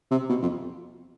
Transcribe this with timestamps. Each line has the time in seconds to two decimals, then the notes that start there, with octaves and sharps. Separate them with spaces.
0.11 C3
0.30 B2
0.42 F2